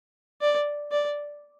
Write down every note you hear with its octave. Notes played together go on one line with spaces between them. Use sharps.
D5
D5